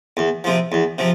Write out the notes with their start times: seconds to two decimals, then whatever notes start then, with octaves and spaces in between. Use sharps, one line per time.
0.17 E2
0.44 C3 F3
0.72 E2
0.98 C3 F3